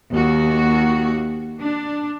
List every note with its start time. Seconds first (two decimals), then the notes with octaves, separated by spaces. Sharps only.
0.13 D#2 A#3 F#4
1.59 D4